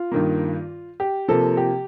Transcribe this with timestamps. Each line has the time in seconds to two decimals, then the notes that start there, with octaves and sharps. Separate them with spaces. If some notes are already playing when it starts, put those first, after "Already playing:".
Already playing: F4
0.12 G2 D#3 A#3
1.00 G4
1.28 C3 F3 A#3 A4
1.57 G4